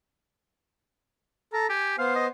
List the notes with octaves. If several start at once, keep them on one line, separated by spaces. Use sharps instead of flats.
A4 A#5
G4 G#5
B3 C5 F5
D#5